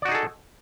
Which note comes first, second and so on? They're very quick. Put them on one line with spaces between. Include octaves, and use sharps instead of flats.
D5 F#4 D#4 G#4 A4